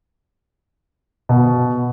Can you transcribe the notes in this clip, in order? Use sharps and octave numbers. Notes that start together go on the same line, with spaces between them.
B2